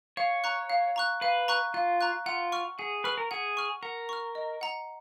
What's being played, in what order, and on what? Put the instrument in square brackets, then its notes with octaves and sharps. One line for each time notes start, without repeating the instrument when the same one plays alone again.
[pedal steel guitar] C#5 [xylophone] F5
[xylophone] A#5 C#6 F#6
F5
A#5 C#6 F#6
[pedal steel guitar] B4 [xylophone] F5
[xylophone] A#5 C#6 F#6
[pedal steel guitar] F4 [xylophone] F5
[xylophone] A#5 C#6 F#6
[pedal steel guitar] F4 [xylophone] F#5
[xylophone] C#6 F6
[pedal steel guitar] G#4 [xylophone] F#5
[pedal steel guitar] B4 [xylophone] C#6 F6
[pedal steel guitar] A#4
[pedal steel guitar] G#4 [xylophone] F#5
[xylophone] C#6 F6
[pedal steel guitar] A#4 [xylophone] F#5
[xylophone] C#6 F6
D#5
F#5 A#5